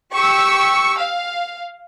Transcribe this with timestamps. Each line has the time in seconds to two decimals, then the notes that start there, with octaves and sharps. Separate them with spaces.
0.12 G4 C#6 E6
0.99 F5